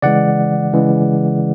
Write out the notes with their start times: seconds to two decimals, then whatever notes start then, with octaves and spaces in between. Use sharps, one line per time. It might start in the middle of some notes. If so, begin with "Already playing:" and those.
0.02 C#3 E3 G#3 D5 F#5
0.73 C#3 E3 G#3